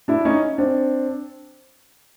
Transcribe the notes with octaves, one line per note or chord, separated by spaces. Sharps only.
D4 E4
C#4 D#4
C4 D4